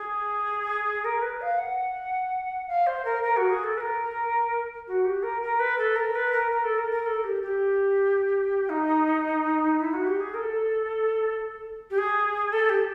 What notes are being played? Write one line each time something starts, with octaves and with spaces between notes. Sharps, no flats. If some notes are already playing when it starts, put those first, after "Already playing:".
Already playing: G#4
A#4
B4
F5
F#5
F5
C5
A#4
A#4
F#4
G#4
A4
B4
A#4
F#4
G4
A#4
A#4
B4
A4
A#4
B4
A#4
A#4
A4
A#4
A#4
A4
G4
G4
D#4
E4
F#4
G4
G#4
A#4
A4
G4
G#4
A4
G4